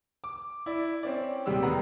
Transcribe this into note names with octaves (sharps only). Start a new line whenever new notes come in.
D6
E4 D5
C4 C#4 D5
D#1 C3 G3 G#3 G4 E6
E1 D#3 G#3 B4 F#5 A#5